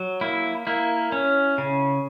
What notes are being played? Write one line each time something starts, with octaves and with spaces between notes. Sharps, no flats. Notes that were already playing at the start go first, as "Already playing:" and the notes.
Already playing: F#3
A#3 E4
A#3 E4
C#4
C#3